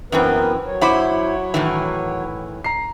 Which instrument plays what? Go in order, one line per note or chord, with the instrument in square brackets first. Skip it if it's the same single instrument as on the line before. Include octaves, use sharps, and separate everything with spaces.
[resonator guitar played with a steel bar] F#2 E3 C4 [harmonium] B3 A#4 B4
[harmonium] F#3 C#5
[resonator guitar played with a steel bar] F#2 E4 C5 [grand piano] F#5 B5 D6
[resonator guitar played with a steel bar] A2 D#3 E3
[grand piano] A#5 C7